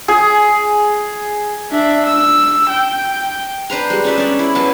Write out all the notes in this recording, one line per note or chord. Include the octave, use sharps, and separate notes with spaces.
G#4
D4 E5
E6
G5
D4 B4 C5 A#5
G3 G#3
C#4 D#4 D5 E5
C#4 D5
E4
B2 F#3 A5